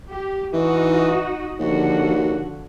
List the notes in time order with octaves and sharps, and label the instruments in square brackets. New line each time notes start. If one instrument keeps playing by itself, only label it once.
[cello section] G4
[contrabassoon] E3 [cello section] D#4 F#4 D#5
[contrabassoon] D#2 [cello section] D3 F3 F#4